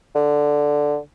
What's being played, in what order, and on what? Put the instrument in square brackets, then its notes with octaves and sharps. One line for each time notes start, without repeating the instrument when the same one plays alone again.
[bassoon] D3